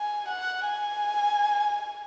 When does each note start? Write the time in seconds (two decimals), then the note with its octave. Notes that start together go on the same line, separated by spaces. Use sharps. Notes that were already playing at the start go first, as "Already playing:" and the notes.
Already playing: G#5
0.29 F#5
0.66 G#5